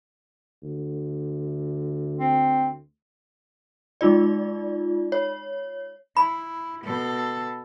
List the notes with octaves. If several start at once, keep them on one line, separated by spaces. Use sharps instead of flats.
D2
C4
G#3 D#4 F4 D5
C#5
E4 B5
B2 A4